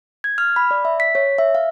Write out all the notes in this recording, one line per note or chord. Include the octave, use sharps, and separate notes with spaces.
G#6
F6
B5
D5
E5
B6
C#5
E5
F5